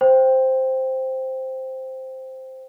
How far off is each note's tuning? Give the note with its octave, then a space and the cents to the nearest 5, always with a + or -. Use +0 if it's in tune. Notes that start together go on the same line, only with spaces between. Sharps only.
C5 +0 G5 +0